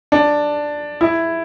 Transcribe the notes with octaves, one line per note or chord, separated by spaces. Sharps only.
D4
E4